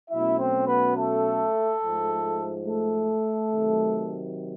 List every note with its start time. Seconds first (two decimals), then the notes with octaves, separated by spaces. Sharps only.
0.10 B2 F#3 A3 C#4 E4 E5
0.39 C4 C5
0.68 B3 B4
0.95 A3 A4
1.82 G#2 F3 A3
2.67 A3 A4
3.52 C3 D#3 F#3